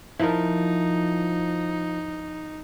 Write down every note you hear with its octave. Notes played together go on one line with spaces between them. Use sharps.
F3 D#4 E4 A#4